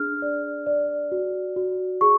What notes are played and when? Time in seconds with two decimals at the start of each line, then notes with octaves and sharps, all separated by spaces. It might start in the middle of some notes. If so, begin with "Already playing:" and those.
Already playing: D4 G#4 F6
0.22 D5
0.66 D5
1.12 F#4
1.56 F#4
2.01 G#4 C#6